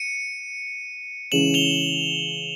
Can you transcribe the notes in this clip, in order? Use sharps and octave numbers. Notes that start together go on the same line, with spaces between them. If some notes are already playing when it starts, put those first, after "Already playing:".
Already playing: C#7 D#7
C#3 E3 G#3 C#4 E7 F#7
F7 G7